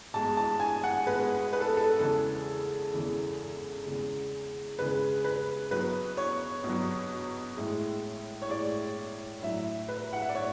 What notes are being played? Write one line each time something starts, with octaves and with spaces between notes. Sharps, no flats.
B2 G#3 A5
A5
G#5
F#5
B2 G#3 B4
B4
A4
A4
E2 C#3 E3 G#3 A4
E2 C#3 E3 G#3
E2 C#3 G#3
E2 C#3 G#3 B4
B4
B2 F#3 B4
C#5
B2 F#3
A2 G#3
C#5
A2 G#3 D5
A2 F#3 E5
B4
F#5
E5
D5
A2 C#5